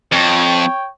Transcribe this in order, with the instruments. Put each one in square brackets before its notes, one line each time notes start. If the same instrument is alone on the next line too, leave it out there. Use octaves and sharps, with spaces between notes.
[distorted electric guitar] F2 [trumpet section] C#5 G5